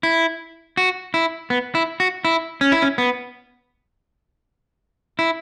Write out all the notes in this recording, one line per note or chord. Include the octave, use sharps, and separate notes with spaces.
E4
F#4
E4
B3
E4
F#4
E4
C#4
E4
C#4
B3
E4